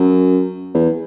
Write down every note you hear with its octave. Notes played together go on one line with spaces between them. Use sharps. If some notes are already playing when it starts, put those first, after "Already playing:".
Already playing: F#2
E2